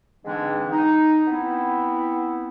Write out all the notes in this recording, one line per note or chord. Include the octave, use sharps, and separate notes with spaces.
G#2 D3 E3 G#3 C4 D4
D#4
B3 C4 E4